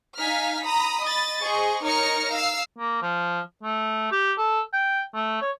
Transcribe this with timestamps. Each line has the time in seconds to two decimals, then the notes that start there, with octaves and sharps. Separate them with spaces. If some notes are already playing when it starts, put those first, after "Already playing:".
0.18 D#4 F5 G#5 F6 B6
0.64 A#5 B5 D#6
1.04 D#5 B5 A6
1.43 G#4 C5 D#5 C#6
1.84 D#4 A#4 C#5 F6 A#6 C#7
2.32 F5 E6 C7
2.78 A#3
3.02 F3
3.63 A3
4.12 G4
4.38 A4
4.73 G5
5.15 A3
5.42 C#5